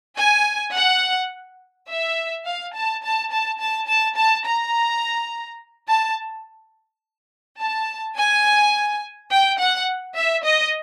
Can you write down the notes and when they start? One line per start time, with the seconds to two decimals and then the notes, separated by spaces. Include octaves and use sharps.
0.18 G#5
0.74 F#5
1.89 E5
2.46 F5
2.75 A5
3.03 A5
3.31 A5
3.60 A5
3.88 A5
4.17 A5
4.46 A#5
5.88 A5
7.59 A5
8.17 G#5
9.31 G5
9.59 F#5
10.16 E5
10.44 D#5